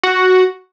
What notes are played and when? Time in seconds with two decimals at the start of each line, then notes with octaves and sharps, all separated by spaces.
0.03 F#4